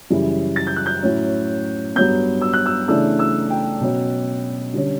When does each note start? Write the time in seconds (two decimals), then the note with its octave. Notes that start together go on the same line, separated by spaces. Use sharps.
0.10 F#2 C#3 E3 G3
0.56 A6
0.67 G6
0.76 F#6
0.86 G6
1.03 A2 F#3 C#4
1.95 G2 F#3 B3 G6
2.41 E6
2.53 F#6
2.66 E6
2.88 C#3 E3 A3 D4 E6
3.19 E6
3.50 G5
3.81 B2 F#3 C#4
4.73 D3 G3 C#4